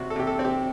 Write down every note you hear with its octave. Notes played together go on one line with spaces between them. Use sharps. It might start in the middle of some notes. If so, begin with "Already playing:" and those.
Already playing: C3 C4 F#4
A4
C3 G4
A4
C4
G4